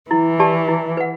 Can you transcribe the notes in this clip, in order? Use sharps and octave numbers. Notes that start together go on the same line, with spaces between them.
E3 E4
G4 D5 A5
E4
B4 F#5